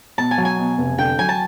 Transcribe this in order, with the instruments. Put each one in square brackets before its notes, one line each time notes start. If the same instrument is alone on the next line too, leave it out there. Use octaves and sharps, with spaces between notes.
[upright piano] B2 [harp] A5
[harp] G#5
[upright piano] F#3
[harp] G#5
[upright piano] B2
F1
[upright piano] D3 [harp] G5
[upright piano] F#3 [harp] G#5
[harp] A5